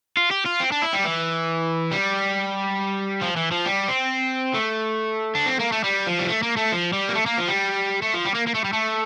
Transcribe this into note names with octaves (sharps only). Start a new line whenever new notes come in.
F4
G4
F4
C4
D4
E4
G3
E3
G3
F3
E3
F3
G3
C4
A3
D4
C4
A#3
A3
G3
F3
G3
A3
A#3
A3
F3
G3
A#3
A3
A#3
F3
G3
A3
F3
G3
A#3
A#3
A3
G3
A3